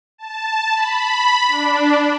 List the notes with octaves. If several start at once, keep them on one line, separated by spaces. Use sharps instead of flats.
A5
B5
D4